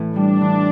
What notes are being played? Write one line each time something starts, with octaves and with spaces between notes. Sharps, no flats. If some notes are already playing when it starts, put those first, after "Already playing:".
Already playing: A2 E3
G3 D4
E3